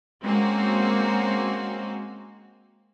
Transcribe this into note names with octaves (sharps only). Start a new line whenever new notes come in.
G#3 A#3 C4 C#4 F#4